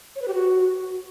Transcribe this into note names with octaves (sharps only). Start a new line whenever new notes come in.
C#5
B4
G4
F#4